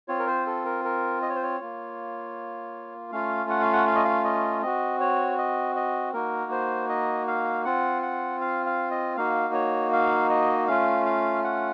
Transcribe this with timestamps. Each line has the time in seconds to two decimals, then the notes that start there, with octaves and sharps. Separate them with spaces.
0.08 C4 F4 C#5
0.19 A#4
0.27 C5
0.46 A4
0.65 A#4
0.85 A#4
1.22 D#5
1.29 C#5
1.36 C5
1.43 C#5
1.60 A#3 F4
3.12 A3 C#4 F4 F5
3.50 F#5
3.61 F5
3.73 F#5
3.87 F5
3.95 D#5
4.05 F5
4.24 D#5
4.62 C4 F#4 D#5
5.00 C#5
5.38 D#5
5.76 D#5
6.14 A#3 D#4 F#4 A#4
6.51 C5
6.89 D#5
7.28 F5
7.65 C4 F4 F#5
8.02 F#5
8.41 F5
8.66 F5
8.91 D#5
9.17 A#3 D#4 F#4 F5
9.54 C#5
9.93 F5
10.30 D#5
10.67 A3 C#4 F4 F5
11.05 F5
11.44 F#5